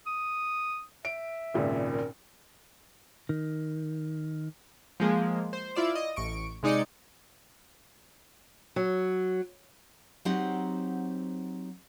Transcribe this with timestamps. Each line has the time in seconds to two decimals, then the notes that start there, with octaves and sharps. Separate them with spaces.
0.06 D#6
1.05 E5 D7
1.54 G#1 C#2 A#2
1.90 A#4
3.29 D#3
5.00 F3 G#3 A#3
5.53 C5
5.76 E4 F4 D5 E7
5.95 D#5
6.16 A1 C#6 D7
6.63 C3 G#3 D#4 D5 D#6 C#7
8.76 F#3
10.25 F#3 C4 D#4 G4 C5 F#5